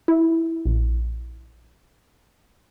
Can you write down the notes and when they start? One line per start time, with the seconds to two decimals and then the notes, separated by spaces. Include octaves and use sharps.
0.08 E4
0.66 A#1